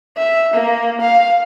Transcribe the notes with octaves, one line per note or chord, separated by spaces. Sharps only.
E5
A#3
F5